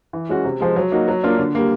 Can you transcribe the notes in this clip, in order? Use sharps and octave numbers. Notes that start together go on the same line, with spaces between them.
E3
G#3 C#4 F#4
C3
F3 G#3
F#3
A#3 D#4 F#4
F#3
A#3 D4 F4
D3
G3 A#3